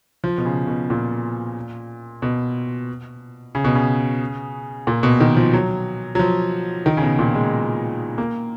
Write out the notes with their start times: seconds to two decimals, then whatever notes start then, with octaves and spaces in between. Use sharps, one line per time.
0.24 F3
0.38 B2
0.45 C#3
0.67 B2
0.90 A#2
2.22 B2
3.55 C#3
3.64 B2
3.75 C#3
4.87 A#2
5.03 B2
5.20 D#3
5.37 F3
5.53 F#3
6.15 F#3
6.19 F3
6.86 D#3
6.97 C#3
7.02 B2
7.19 A#2
7.35 G#3
8.18 A#3